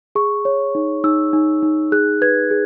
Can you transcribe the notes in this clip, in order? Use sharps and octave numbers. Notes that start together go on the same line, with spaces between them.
G#4 C#6
C#5
D#4
D#4 E6
D#4
D#4
G#4 F#6
B4 G#6
G#4